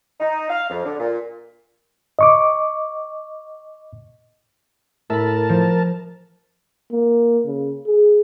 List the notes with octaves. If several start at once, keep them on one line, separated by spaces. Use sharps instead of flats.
D#4
F5
F2
D3
A#2
D#5 C#6 D6
A2 A#4 E5 A5 B5
F3
A#3
C#3
G#4